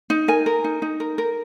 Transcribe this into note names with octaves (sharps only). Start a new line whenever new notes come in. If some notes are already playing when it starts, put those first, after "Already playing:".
D#4
A#4 G#5
A#4
D#4
D#4
A#4
A#4